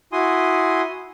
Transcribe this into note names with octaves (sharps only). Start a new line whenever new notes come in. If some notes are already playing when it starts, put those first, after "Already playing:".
E4 F#4 G#5 C6 D#6